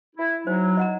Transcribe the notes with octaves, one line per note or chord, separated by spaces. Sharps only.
E4
F#3 D#4 C5
D#5 F#5 A#5